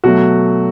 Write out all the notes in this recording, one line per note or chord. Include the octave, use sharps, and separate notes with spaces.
B2 F#3 A3 F#4